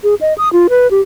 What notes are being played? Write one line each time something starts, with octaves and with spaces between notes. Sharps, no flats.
G#4
D#5
D#6
F4
B4
G4